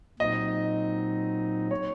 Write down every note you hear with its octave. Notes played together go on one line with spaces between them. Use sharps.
A#2 F#3 C4 D#4 D#5
C#5